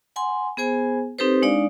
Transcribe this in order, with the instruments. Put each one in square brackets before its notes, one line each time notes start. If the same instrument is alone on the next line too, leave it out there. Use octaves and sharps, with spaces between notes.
[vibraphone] F#5 G#5 C6
B3 G#4 C5 G#5
C4 D#4 G4 A4 B4 C5
G#3 D4 D#4 D5 F5